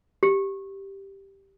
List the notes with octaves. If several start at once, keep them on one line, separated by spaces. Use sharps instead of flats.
G4